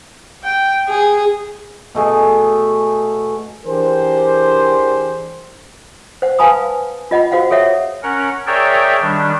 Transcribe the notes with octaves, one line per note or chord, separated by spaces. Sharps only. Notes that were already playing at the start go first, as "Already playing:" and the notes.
G5
G#4
B2 A3 G#4
E3 D4 G4 G#4 A#4 C5
C5 F#5
B4 F5 G#5 A5 B5 D#6
F4 D#5 F#5 B5
F#4 C5 F5 F#5
G#4 A4 C#5 E5 F#5
C#4 A#4 F#5
G#4 A#4 C#5 D5 E5 G5
D#3 G3 D4